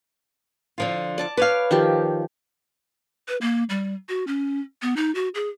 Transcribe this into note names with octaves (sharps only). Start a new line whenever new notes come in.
D3 F3 F4
D5 A5 D6
B4 C#5 F5 D6
D#3 F3 G4
B4
A#3
G3
F#4
C#4
B3
D#4
F#4
G#4